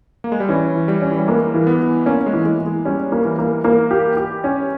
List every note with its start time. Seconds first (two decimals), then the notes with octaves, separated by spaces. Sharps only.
0.24 A#3
0.32 G#3
0.40 G3
0.49 E3 C#4
0.75 E3
0.88 G3
1.02 C#4
1.12 E3
1.20 G3
1.28 G#3 A#3
1.54 E3
1.67 B3
1.80 E3
2.06 A#3 C#4
2.26 G#3
2.33 E3
2.46 G#3
2.59 E3
2.66 G#3
2.85 G3 C#4
3.12 A#3
3.25 E3
3.39 A#3
3.64 A#3
3.91 G4
4.17 G4
4.44 C#4